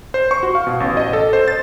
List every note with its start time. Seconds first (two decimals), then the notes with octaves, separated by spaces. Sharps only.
0.14 C5
0.31 C#6
0.43 F#4
0.55 F5
0.67 B2
0.80 A1
0.97 D#5
1.13 A4
1.33 C5
1.48 A6